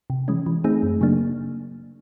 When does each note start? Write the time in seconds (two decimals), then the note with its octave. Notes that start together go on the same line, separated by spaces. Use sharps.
0.10 C3
0.28 E3 G#3 C#4
0.46 E3
0.64 A3 C4 D#4 G#4
0.83 F#2
1.01 C#3 F#3 A#3 D4